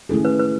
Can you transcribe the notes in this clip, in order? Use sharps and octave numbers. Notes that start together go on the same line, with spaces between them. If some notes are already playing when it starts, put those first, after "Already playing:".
D#3 A3 C#4 E4 G#4 A4
B4
B4